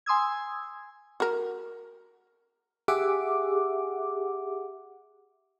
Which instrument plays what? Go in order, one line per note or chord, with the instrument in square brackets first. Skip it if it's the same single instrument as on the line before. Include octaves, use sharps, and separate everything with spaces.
[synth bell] G#5 C6 D#6 E6 G#6
[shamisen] F#4 A#4
[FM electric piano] G4 G#4 E5 F#5 D6